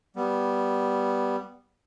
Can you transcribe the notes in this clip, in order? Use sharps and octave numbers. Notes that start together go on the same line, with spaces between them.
G3 B3